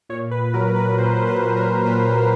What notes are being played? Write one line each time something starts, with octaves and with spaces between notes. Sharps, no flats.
A#2 C#5
B4
F#3 A#4
B4
A#2 C5
C5
B4
A#2
B4
A#4
A#2 B4